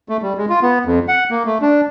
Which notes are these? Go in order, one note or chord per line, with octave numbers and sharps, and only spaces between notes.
A3
G3
G#3
F4
B3
F2
F#5
A#3
A3
D4